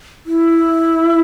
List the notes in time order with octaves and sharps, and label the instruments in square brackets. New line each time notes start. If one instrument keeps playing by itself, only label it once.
[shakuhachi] E4